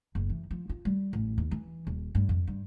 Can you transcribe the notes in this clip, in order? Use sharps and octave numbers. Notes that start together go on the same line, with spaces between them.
F#1
E3
F3
F4
G3
A1
D#2
E3
D#1
G2
F2
G2